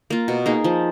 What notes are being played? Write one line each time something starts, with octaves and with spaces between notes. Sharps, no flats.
A#3 F4
B2
A#3 D#4 G#4
F3